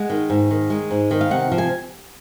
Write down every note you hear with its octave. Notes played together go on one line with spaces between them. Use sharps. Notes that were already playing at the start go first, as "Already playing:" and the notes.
Already playing: G#3 F#5
D#3
G#2
D#3
G#3
G#2
D#3
F5
C3 F#5
F3
G#5